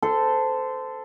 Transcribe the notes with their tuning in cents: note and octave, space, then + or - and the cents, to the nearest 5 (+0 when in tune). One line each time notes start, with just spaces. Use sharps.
A4 +0 C5 -25